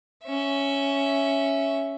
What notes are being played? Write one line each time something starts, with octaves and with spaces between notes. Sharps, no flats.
C#4 E5